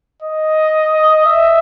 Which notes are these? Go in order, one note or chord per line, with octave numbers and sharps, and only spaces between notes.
D#5
E5